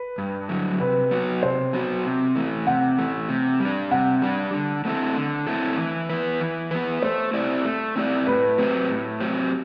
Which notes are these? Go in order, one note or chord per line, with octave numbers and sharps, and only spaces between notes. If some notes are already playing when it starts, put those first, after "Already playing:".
Already playing: B4
G2
D3 F#3
C3 B4
F#3 B3 F#4
C3 C5
F#3 B3 F#4
C3
E3 A3
C3 F#5
E3 A3
C3
G3
D4
C3 F#5
G3 D4
D3
A3 C4 E4 A4
D3
A3 C4 E4 A4
E3
B3 E4 B4
E3
B3 E4 B4
A3 C5
C4 E4 G4 D5
A3
C4 E4 G4 D5
A2 B4
F#3 C4 G4 C5
A2
F#3 C4 G4 C5